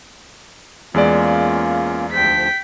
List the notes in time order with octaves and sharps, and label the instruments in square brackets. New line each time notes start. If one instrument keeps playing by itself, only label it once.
[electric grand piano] E2 G#3 D5 [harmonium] A#3 C#4 F4
[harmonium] D2 F3 C5 [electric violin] G5 B6